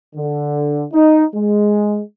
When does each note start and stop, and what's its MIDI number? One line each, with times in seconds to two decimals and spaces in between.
0.16 0.84 50
0.94 1.25 63
1.36 1.99 56